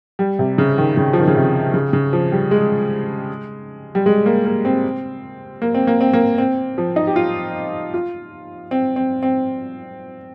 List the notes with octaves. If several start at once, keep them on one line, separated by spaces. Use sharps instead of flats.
G3
C3
C#3
D#3
C#3
F3
D#3
C#3
C3
C#3
C#3
F3
G3
G#3
G3
G#3
A#3
A#3
C4
A#3
C4
A#3
C4
A#3
C4
F3
D#4
G4
F4
F4
C4
C4
C4